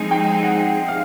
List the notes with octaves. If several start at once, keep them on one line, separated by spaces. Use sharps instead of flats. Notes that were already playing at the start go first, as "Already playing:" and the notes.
Already playing: F3 G#3 C4 D#4 G#4 G#5
G5
F#5
F5